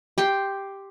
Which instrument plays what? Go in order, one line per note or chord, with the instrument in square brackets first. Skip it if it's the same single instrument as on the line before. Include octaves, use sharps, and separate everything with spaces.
[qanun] G4 G5 C6